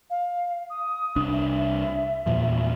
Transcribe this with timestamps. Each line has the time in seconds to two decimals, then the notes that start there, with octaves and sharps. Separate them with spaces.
0.10 F5
0.70 D#6
1.16 C2 D4
1.33 E5
2.26 E2 A#2 F3